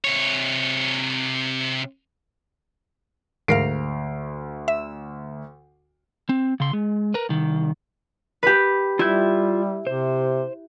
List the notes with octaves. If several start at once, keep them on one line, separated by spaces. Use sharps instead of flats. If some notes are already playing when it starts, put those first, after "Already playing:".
C3 C#5
D2 G#2 A#4 F5 C7 D7
E5
C4
C#3 C6
G#3
A#4 B4
C2 D#3
G4 B4
G3 E4 F4 E5 G6
C3 C5